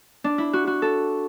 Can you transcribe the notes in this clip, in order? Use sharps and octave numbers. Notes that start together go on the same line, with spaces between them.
D4
E4
F#4
F#4
A4